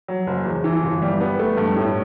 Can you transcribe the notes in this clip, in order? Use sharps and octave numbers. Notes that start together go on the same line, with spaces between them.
F#3
F#1
E2
E3
G1
G3
B3
A3
G2
A2